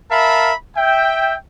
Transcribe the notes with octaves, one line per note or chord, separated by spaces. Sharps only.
A#4 E5 F5 A5 B5
E5 G5